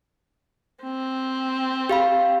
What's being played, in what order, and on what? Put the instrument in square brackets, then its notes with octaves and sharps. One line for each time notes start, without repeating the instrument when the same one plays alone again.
[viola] C4
[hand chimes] G4 F5 B5